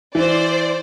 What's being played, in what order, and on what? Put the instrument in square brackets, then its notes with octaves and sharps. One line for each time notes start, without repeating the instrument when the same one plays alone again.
[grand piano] E3 [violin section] C5 D5